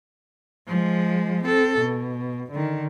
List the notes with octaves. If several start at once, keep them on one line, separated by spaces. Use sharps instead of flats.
F3 G#3
C4 A4
B2
D3 D#3